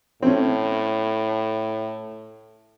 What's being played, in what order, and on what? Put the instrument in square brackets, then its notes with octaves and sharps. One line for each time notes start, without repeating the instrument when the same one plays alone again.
[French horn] A2 [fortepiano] C4 C#4